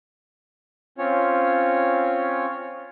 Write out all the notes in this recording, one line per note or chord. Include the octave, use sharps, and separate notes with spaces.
C4 C#4 F4 C#5